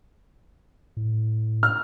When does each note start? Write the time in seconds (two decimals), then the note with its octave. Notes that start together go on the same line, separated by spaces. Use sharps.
0.97 A2
1.63 F6